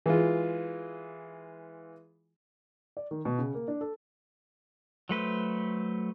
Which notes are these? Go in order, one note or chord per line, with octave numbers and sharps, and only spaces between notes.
E3 G#3 F4
D5
D#3
B2
C#3
A#3
D4
A4
F#3 A3 B4 C5